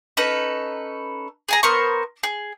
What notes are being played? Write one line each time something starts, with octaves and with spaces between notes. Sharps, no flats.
C#4 D#4 A4 B4
G#4 G#5 A#5
B3 A#4 C5 C#6
G#4